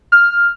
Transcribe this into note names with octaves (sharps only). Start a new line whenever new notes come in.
F6